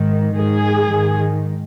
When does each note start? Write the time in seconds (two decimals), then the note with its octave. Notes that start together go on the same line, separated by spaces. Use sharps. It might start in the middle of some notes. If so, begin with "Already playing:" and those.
Already playing: G#2 D#3
0.36 G#2 D#3 G#4
0.91 G#2 D#3